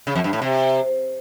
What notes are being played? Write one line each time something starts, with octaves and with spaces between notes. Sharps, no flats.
C#3
F2
G2
A2
C3